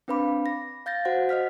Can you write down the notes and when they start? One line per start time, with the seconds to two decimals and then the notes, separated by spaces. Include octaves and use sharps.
0.08 C4 D4 B4 F5 B5 D6
0.46 A#6
0.86 F5 G6 A6 A#6
1.05 F#4 C5 F#5
1.29 D#5 F#5 F6 B6